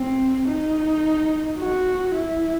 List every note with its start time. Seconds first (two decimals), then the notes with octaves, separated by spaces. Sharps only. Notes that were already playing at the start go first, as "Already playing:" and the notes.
Already playing: C4
0.48 D#4
1.59 F#4
2.15 E4